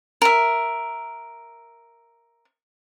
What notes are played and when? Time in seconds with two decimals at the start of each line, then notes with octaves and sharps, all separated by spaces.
0.22 A#4 E5